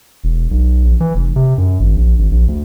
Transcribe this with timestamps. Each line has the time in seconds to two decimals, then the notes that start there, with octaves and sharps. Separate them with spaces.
0.24 E1
0.51 B1
0.83 A#1
1.00 E3
1.15 F1
1.36 C3
1.58 F#2
1.80 G#1
1.96 A#1
2.19 G#1
2.31 A#1
2.48 D2